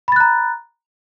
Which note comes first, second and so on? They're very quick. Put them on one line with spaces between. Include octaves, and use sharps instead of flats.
B5 A6 F#6 A#5